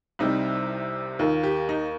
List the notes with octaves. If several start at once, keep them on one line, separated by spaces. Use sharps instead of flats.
C2 C3 G3 C4 D#4
D#2 D#3 A#3 F4
G4
D#4